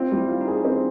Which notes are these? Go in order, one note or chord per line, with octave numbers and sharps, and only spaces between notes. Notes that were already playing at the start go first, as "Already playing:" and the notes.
Already playing: C4 F4
G3
E4
F4
D#4
G#4
D#4
C4 D4